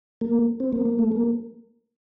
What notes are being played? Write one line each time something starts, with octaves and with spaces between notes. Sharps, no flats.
A#3
C4
A#3
A#3
A3
A#3